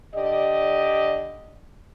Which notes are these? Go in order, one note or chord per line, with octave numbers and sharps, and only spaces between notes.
D3 G4 D5 D#5